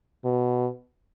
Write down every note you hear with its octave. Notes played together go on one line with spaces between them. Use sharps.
B2